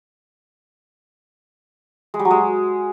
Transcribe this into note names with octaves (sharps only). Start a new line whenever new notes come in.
G#3
G3
F#3
G#3